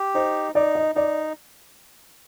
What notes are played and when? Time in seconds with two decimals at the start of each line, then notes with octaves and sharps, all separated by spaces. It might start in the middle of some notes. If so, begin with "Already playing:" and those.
Already playing: G4
0.15 D#4 C5
0.55 D#4 D5
0.75 D#5
0.95 D#4 D5